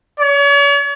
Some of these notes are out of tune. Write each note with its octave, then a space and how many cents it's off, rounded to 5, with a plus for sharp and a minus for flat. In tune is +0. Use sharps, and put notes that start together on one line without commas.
C#5 +40